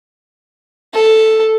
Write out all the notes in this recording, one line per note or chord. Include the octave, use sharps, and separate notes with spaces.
A4